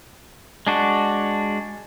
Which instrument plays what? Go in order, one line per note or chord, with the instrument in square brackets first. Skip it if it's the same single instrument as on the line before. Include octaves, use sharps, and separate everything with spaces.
[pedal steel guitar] G#3 D4 F#4